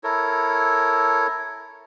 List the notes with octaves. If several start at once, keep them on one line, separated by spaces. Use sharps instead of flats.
E4 A4 A#4 C#5